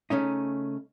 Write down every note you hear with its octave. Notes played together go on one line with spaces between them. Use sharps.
C#3 A3 C#4 D#4